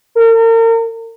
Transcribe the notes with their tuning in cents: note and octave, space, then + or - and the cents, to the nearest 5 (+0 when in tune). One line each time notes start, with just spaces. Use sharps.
A#4 -40